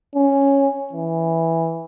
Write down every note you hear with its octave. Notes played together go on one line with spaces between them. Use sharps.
C#4
E3